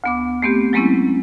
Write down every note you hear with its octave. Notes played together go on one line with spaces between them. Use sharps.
D2 B3 D6
A3 B3 C4 G4
F#3 G#3 A#3 C4 C#4 E4